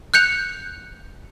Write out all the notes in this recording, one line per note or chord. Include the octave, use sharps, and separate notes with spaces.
F#6 G6 C#7 F7